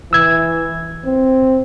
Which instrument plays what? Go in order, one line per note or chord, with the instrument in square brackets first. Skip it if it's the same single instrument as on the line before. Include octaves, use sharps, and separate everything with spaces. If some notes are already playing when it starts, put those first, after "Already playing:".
[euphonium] E3 [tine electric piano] E6 G#6
[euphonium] C4